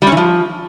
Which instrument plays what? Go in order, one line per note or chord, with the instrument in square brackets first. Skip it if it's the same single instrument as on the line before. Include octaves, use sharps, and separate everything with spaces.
[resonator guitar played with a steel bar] G3
C#4
E3
F3